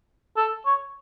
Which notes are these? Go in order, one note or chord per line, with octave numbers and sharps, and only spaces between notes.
A4
C#5